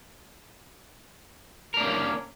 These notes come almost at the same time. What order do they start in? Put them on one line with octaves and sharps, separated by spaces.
A#4 D4 A#3 C#4